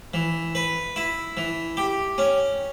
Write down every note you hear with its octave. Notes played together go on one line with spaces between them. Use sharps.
E3
B4
E4
E3
G4
C#4